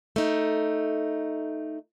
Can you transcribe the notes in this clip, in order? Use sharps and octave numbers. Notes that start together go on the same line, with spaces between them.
A3 D#4